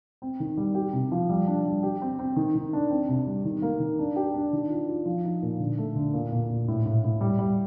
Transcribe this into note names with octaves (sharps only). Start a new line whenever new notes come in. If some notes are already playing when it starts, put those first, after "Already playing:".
C4
D#3
G3
G4
C3
F3
G3
D4
G3
G4
C4
C4
D#3
D#3
D4
C4
C3
G3
D#3
A#3
D#3
D4
G4
D4
D#3
F4
F4
F3
D#4
A#2
D3
A3
D3
A#2
A#2
A#2
A2
A2
A2
G3
G3